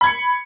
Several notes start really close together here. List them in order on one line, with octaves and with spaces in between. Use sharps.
B5 G#6 C#7